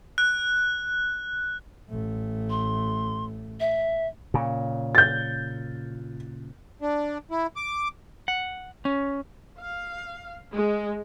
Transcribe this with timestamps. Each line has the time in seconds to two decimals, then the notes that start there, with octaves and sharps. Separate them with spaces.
0.18 F#6
1.90 A1 A3
2.50 C6
3.60 E5
4.34 A#2 C#3
4.95 G6 A6
6.81 D4
7.31 E4
7.56 D6
8.28 F#5
8.85 C#4
9.58 F5
10.54 G#3